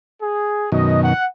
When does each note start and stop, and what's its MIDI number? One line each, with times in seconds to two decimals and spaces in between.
0.20 0.67 68
0.72 1.13 42
0.72 1.13 47
0.72 1.13 51
0.72 1.04 75
1.04 1.25 78